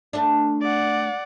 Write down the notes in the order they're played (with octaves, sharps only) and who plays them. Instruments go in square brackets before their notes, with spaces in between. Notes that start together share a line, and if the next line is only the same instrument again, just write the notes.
[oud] A3 D4
[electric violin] D5 F#5